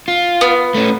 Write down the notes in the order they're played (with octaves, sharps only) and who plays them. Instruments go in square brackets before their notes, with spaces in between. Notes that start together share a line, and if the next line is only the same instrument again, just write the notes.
[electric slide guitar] F4
[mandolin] B3
[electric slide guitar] A3 C#4